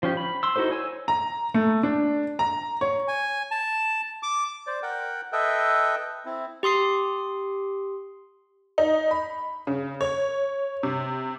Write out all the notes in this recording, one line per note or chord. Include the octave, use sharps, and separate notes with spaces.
F3 C#4 G4
B5
C6 E6
D#4 E4 F#4 A4 C5
C#5 G#5 E6
A#5
A3
D4
A#5
C#5
G#5
A5
D6
C5 D5
A#4 F#5 G5
A4 B4 D#5 E5 G5
C4 E4
G4 C6 D#6 C7
D#4
B5
C#3
C#5
C3